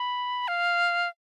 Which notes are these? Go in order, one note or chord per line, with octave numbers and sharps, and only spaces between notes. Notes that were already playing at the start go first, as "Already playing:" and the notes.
Already playing: B5
F5